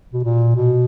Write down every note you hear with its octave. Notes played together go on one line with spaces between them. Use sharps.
B2
A#2
B2